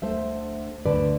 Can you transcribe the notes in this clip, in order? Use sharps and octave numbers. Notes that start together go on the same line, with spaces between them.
D2 D3 A3 C5 E5
D2 D3 A3 B4 D5